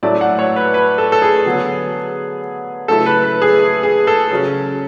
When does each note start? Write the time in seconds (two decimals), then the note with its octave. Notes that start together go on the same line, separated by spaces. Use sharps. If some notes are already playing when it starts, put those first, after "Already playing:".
0.03 A2 F#3 A3 E4 D5
0.21 F#5
0.39 C#5
0.56 B4
0.74 B4
0.98 A4
1.12 A4
1.22 G#4
1.45 D3 F#3 B3
2.88 C#3 F#3 A3 E4 A4
3.06 B4
3.24 B4
3.42 G#4
3.83 G#4
4.07 A4
4.31 C#3 F#3 C#4